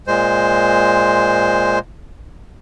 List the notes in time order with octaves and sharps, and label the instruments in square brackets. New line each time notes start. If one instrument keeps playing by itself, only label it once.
[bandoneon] A#2 G#3 C5